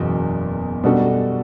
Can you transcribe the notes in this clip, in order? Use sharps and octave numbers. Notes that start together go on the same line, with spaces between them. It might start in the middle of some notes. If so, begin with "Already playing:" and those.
Already playing: F#1 E2 B2
B2 G3 D4 F#4 A4